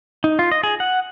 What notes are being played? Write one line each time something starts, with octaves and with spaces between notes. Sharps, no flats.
D#4
F4
D#5
G#4
F#5